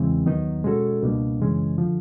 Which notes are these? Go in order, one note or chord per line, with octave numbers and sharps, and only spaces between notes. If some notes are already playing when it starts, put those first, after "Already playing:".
Already playing: E2 C#3 E3 G#3 C4
D#2 D#3 F#3 B3 D#4
B2 G#3 C#4 F#4 A4
C#2 B2 G3 A#3 D4
F#2 C#3 E3 G#3 C#4
D3 F3